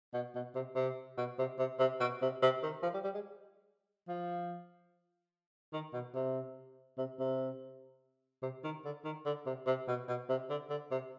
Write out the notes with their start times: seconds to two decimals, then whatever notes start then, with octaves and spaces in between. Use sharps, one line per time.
0.14 B2
0.35 B2
0.55 C3
0.75 C3
1.17 B2
1.38 C3
1.59 C3
1.79 C3
2.00 B2
2.22 C3
2.42 C3
2.63 D#3
2.83 F3
2.94 G3
3.04 G3
3.14 G#3
4.08 F3
5.73 D#3
5.93 B2
6.15 C3
6.98 C3
7.19 C3
8.42 C3
8.64 D#3
8.85 D3
9.04 D#3
9.26 D3
9.46 C3
9.67 C3
9.88 B2
10.08 B2
10.29 C3
10.50 D3
10.70 D3
10.91 C3